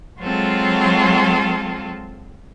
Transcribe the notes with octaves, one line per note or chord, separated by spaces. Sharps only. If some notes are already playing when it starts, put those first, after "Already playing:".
F#3 G#3 C4 F4 A4